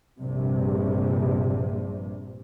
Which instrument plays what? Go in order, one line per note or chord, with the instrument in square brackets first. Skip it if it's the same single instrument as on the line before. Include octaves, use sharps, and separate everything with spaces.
[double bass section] A#1 G2 C3